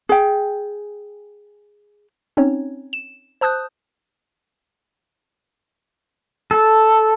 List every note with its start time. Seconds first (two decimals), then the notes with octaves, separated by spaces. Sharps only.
0.09 G#4 G5
2.37 C4 C#4 D#4 C#5
2.93 E7
3.41 C5 A5 D#6 F#6 G6
6.51 A4